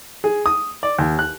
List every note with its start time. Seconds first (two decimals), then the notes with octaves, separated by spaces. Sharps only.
0.24 G#4
0.46 D#6
0.83 D5
0.98 D#2
1.19 F#6